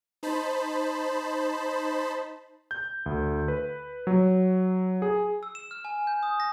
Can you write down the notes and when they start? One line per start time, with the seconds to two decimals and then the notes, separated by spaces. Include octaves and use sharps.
0.23 D#4 C5 A5 B5
2.71 G6
3.06 D2
3.48 B4
4.07 F#3
5.02 G#4
5.43 E6
5.55 E7
5.71 F6
5.85 G#5
6.07 G6
6.23 D#6
6.40 A#6